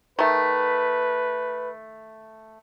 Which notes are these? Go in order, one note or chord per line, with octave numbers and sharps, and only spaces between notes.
D#3 A3 B4